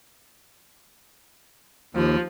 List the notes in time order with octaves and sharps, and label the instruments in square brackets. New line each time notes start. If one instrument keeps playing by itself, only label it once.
[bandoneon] D#2 [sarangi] F3